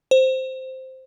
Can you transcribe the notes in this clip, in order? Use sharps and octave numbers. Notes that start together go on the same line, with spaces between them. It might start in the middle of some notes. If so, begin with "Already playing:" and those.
C5